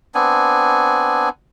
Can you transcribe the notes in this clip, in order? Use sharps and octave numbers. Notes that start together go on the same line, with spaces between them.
B3 C4 D4 G#5